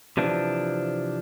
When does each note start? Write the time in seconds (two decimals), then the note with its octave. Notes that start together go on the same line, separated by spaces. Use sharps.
0.17 C3 E3 F3 D4